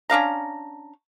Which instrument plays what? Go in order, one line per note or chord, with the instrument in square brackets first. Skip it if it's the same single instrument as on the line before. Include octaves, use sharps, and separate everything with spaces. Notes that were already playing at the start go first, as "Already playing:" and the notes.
[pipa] C#4 D4 F5 A#5